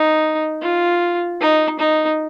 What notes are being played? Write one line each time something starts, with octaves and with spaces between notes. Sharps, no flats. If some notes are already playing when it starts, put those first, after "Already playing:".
Already playing: D#4
F4
D#4
D#4